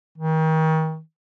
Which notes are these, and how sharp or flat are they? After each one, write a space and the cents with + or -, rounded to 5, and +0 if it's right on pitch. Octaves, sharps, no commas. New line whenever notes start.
D#3 +35